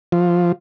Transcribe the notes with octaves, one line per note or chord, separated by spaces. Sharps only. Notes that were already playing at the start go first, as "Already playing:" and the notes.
F3